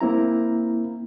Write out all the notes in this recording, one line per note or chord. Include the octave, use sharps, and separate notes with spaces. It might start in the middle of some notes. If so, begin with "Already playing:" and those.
A#3 C4 E4 A#5